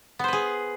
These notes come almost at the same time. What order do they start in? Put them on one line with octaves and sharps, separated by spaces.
B3 C5 B4 G#4